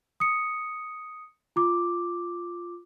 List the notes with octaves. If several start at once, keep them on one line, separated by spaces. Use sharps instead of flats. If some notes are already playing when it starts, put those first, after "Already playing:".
D#6 C#7
F4 D6